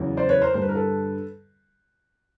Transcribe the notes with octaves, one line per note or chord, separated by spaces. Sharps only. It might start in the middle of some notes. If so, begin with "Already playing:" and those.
Already playing: E2 C#3 F#3
C5 D5
B4 C#5
A#4 C5
G2 D3 G3 C5
B4
A#4
A4 B4